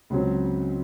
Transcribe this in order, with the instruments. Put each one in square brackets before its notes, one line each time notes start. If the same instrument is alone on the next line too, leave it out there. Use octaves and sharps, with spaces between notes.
[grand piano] C#2 C#3 F#3 C4